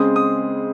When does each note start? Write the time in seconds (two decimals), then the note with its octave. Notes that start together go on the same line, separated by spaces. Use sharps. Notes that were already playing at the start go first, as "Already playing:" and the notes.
Already playing: C#3 G#3 C4 D#6
0.16 D#6